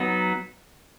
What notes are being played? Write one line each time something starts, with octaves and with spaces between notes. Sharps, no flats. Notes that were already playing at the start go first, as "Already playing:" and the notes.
Already playing: F#3 B3 D#4